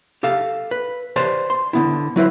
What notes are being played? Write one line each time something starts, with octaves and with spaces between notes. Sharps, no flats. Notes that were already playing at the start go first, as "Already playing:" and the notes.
G4 A4 F5
B4
G4 B4 C5 D5 A5
C6
D3 B3 E4
F#3 E4 B4 C5